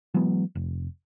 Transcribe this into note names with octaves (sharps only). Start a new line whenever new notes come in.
E3 F#3 G#3 B3
F1